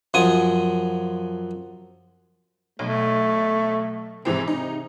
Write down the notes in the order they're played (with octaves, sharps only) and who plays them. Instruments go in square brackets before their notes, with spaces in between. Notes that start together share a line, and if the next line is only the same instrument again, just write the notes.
[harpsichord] F#2 F3 G#5 D#6
[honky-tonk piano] B1 [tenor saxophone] A3
[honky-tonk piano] G#2 E3 C4 [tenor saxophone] C3
[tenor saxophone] C3 [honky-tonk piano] D#4